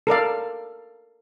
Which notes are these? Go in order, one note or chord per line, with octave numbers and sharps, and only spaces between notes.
A4 A#4 D5 F5